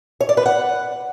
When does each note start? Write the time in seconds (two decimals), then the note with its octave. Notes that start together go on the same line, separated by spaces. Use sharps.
0.20 C#5
0.29 D5
0.37 B4
0.46 F#5